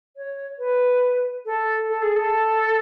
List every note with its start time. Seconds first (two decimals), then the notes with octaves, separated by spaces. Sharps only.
0.16 C#5
0.59 B4
1.46 A4
1.89 A4
2.02 G#4
2.16 A4